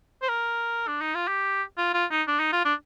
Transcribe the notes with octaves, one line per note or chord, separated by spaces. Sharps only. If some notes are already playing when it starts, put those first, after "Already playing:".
C5
A#4
D4
D#4
F4
G4
F4
F4
D#4
D4
D#4
F4
D4